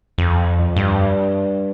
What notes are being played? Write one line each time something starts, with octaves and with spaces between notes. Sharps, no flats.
F2
G2